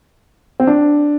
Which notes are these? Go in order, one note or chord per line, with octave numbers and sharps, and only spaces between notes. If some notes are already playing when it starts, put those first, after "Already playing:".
C4
D4